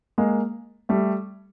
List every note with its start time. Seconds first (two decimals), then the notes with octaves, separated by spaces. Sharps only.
0.18 G#3 A#3
0.89 G3 A3